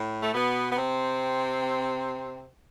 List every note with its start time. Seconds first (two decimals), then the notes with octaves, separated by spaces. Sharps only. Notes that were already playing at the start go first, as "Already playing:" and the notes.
Already playing: A2
0.22 A3
0.34 B2 B3
0.70 B3
0.75 C3 C4